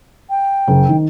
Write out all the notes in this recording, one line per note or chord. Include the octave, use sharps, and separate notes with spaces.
G5
F#1
D#3